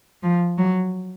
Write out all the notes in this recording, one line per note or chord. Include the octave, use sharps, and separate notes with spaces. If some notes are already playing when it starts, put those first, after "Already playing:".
F3
F#3